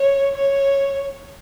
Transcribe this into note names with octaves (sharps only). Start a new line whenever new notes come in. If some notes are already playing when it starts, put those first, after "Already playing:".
Already playing: C#5
C#5